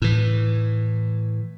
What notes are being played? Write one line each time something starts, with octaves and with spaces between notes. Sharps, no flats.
A2 E3